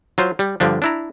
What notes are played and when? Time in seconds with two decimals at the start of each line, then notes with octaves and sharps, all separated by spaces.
0.18 F#3 F4 C5
0.39 G3
0.60 G2 D3 F3 D4
0.82 D4 E4 A#5